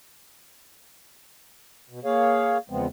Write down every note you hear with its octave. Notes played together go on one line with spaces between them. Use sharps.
B2
A#3 G#4 C#5 F5
E2 C#3 F3 G#3 B3 C4